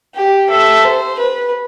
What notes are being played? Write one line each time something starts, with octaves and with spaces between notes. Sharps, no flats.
G4
A4 E5
C5
B4